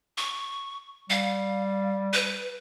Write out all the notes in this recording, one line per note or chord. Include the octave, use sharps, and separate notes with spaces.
C#6
G3 F5
B4